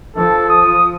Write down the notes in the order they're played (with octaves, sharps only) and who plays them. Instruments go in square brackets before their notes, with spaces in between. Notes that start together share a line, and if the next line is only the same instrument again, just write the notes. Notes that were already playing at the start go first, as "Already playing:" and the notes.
[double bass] F3 [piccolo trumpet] A4
[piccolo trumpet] D#6